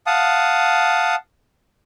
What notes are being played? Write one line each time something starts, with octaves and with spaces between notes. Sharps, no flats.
F5 F#5 A5 D#6